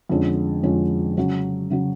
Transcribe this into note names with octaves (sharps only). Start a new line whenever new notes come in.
F2 D3 G#3 C#4
F2 D3 G#3 C#4
C#3 F#3 C#4
C#3 F#3 C#4